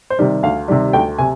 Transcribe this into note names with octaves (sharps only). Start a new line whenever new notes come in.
C5
C3 D#3 G3
D2 F5
C3 D#3 G3
D2 G5
C3 G#5